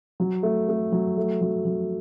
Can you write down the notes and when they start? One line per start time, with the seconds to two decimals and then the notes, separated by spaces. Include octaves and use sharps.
0.20 F#3
0.43 A3
0.69 A3
0.92 F#3
1.17 A3
1.41 F#3
1.65 F#3